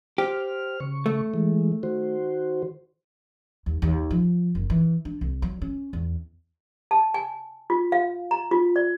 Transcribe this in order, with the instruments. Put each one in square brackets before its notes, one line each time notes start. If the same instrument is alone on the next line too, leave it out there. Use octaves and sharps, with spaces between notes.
[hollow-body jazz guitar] G4 [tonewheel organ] C5 F6
[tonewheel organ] C#3 C#6
[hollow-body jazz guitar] A3
[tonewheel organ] E3 G#3
D#3 F#4 C5
[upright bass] D#2
D#2
F3
F#1
E3
D4
C2
F#3
C#4
E2
[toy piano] A5
G#5
F4
F5
A#5
F4
D5